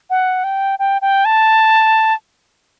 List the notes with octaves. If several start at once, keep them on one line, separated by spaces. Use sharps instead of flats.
F#5
G5
G5
G5
A5